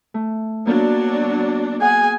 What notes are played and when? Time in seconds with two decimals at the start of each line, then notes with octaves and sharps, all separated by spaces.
0.14 A3
0.67 F#3 A#3 B3 D4
1.82 G#4 F#5 G#5